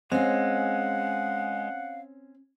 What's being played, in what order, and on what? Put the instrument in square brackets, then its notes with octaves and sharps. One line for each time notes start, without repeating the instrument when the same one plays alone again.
[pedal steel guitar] G#3 [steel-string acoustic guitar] C4 C#4 [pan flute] F5 [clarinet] F#5